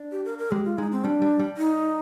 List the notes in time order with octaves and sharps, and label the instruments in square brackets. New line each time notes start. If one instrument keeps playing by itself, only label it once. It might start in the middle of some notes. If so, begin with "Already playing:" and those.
Already playing: [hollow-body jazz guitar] D4
[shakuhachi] G4
A#4
A#4
[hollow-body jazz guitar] G#3 [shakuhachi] G4
[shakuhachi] F4
[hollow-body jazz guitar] G#3 [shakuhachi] D#4
[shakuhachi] C4
[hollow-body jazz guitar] G3 [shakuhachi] D4
[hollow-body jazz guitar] G3
G3
[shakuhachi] D#4